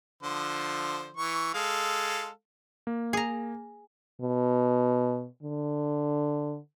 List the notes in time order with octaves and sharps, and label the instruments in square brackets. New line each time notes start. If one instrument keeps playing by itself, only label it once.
[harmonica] D3 F3 C5
E3 C#6
G#3 A4 F5
[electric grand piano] A#3
[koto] G#4 A#5
[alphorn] B2
D3